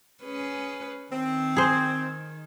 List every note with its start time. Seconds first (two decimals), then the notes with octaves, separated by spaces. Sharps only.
0.24 C#4 G#4 B4
1.13 D#3 C4
1.56 G#4 C5